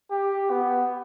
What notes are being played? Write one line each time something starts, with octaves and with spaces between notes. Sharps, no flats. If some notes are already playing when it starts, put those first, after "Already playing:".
G4
B3